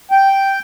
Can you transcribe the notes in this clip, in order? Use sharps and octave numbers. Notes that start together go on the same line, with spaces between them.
G5